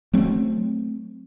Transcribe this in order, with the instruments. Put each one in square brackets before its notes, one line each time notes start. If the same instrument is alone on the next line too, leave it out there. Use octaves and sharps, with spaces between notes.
[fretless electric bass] F#3 A3 C4